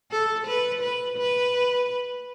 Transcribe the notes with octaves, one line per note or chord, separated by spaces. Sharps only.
A4
B4
B4
B4